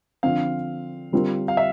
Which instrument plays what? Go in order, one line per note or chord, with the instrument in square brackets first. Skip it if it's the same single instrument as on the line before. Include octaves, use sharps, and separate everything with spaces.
[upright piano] D3 F3 C4 [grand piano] F5
[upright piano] D3 G3 C4 F4 A#4
[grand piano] F5
E5